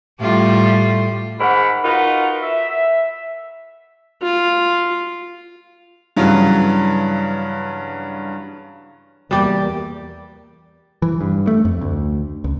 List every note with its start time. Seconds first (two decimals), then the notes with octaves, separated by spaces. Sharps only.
0.20 A2 G3 F4
1.40 G#2 D#3 F#5 B5
1.85 D#4 F4 F#4 A#4 B4
2.42 E5
4.22 F4
6.17 G2 C#3 E3 F#3
9.31 E2 G3 A#3 G4
11.02 E3
11.21 G2
11.47 A3
11.65 F2
11.81 D2
12.44 C#2